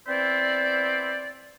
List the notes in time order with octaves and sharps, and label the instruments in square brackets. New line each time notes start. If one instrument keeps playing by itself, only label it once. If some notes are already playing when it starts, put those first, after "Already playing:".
[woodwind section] B3 C4 E4 C5 D5